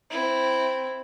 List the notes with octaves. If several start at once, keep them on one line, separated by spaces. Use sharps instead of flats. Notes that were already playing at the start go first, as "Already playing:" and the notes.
C4 E4